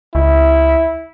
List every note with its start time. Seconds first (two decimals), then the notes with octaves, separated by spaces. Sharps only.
0.15 C#2 E4